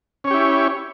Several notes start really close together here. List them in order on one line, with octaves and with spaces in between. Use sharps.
C#4 C#5 G4 E4